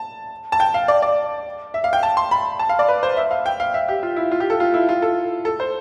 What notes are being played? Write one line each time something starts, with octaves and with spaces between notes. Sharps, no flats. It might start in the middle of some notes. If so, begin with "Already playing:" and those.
Already playing: A5
A5
G5
F5
D5
D5
E5
F5
G5
A5
C6
B5
A5
F5
D5
B4
C5
E5
F5
G5
F5
E5
G4
F4
E4
F4
G4
A4
F4
E4
F4
A4
A4
C5